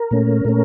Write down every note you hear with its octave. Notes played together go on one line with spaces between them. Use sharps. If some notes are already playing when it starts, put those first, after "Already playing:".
Already playing: A#4
A#2 A3 C#4
A#2 A3 C#4